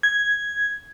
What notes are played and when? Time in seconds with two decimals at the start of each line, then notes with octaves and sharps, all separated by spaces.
0.03 G#6